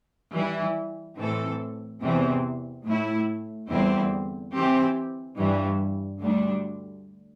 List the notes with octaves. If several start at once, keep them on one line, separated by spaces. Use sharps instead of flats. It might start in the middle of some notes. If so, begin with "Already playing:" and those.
E3 G3 E4
A2 E3 C4 A4
E2 C3 E3 C4
A2 A3 E4
E2 D3 G3 C4 E4
E3 C4 G4
G2 E3 G3
D2 D3 G3 D4